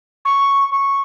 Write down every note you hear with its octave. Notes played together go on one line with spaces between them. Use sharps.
C#6
C#6